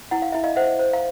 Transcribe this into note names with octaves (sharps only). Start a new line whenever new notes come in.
E4 F#5
F5
E4 E5
D#5 F5
C5 E5 F#5
C5
F5